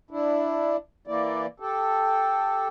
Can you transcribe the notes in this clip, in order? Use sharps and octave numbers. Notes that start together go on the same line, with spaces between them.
D4 E4
E3 A#3 E4 D5
G4 A4